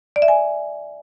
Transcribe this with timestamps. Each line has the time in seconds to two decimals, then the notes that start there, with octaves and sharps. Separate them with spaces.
0.16 D5
0.22 E5
0.28 G#5